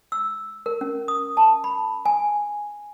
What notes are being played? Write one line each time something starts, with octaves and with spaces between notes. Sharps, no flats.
E6
A#4
C#4
D#6
A5
B5
G#5